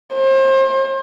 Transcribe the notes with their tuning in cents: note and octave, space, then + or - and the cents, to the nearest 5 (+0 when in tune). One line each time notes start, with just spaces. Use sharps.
C5 +35